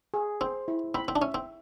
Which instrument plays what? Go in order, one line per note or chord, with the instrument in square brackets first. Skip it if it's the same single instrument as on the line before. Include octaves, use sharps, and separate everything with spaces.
[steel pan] G#4
[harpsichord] C4 [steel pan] C5
[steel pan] E4
[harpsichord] C4 [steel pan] B5
[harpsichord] C4
D4
[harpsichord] C#4 [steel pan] E5
[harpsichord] C4